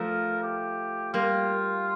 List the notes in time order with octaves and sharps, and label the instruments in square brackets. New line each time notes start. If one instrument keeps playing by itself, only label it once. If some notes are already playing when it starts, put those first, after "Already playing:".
Already playing: [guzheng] F3 A3 [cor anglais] A#4
[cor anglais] G4
[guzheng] G3 A#3 [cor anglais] F4